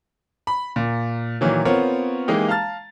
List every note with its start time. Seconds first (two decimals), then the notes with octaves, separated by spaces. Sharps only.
0.47 B5
0.76 A#2
1.41 A#2 D#3 E3 F#3
1.65 B3 C4 F4 A#4 C#5 F#5
2.28 E3 G#3 A#3 D#4 G4
2.48 F5 A5 A#5 F6 A6